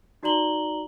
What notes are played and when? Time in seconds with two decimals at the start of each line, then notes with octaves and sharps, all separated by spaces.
0.23 D#4 F#4 D5 A#5 F#7 G7